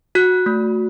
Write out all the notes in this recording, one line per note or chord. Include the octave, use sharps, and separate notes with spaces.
F#4 F#6
A3